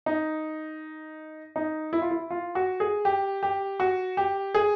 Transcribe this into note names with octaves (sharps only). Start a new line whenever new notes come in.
D#4
D#4
E4
F4
E4
F4
F#4
G#4
G4
G4
F#4
G4
G#4